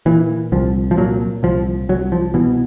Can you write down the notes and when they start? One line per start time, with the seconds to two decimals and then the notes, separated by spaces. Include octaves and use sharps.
0.06 A#2 E3
0.52 C2 F3
0.91 F3
0.97 A#2 F#3
1.43 C2 F3
1.89 C2 F#3
2.12 F3
2.34 B2 E3